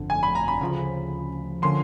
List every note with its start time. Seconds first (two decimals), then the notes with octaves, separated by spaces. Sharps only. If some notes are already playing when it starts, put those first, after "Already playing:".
Already playing: G1 F2 D3
0.10 G#5
0.23 B5
0.35 A#5
0.48 B5
0.61 D2 C#3 F3
1.62 D3 F3 A#3 C#4 C6